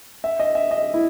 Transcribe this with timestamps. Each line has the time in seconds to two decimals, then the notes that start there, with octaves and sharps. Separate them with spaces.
0.24 E5
0.40 D#5
0.55 E5
0.71 D#5
0.94 E4